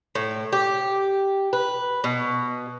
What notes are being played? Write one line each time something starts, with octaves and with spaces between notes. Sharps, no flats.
A2
G4
B4
B2